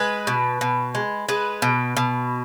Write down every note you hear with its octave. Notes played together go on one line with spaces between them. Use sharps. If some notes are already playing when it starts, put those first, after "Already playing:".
Already playing: G#3 B4
B2
B2
G#3
G#3 B4
B2
B2